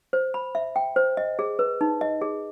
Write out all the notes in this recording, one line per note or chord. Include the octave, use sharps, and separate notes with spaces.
C5
B5
E5
G5
C5
D#5
G#4
B4
D#4
D#5
G#4